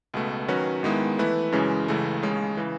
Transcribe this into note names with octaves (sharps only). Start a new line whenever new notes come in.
C#2 B2 A3
D#3 F#3 C#4 F#4 B4
G#2 D#3 G#3 B3 E4
E3 A3 E4 B4
F#2 C#3 E3 G#3 C#4
C#2 C#3 E3 A3
D#2 C#3 G#3 C#4
C#3 E3